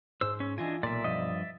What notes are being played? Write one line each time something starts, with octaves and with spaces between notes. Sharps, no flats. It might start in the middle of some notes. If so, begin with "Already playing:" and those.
G#2 C5 E6
C#4
E3 D4 F4 D#5 G#5
B1 A#2 D5 E5
G2 F3 D#5